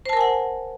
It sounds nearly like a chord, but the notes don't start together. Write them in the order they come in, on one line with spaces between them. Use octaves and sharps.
C5 A5 A#4 G#5 F#5